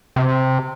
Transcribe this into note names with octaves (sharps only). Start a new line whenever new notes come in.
C3